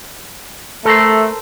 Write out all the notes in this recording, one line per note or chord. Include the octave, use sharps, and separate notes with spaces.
A3 A4 A#4 C5